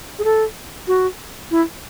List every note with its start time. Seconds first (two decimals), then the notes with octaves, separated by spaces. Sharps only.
0.19 G#4
0.24 A4
0.87 F#4
1.51 E4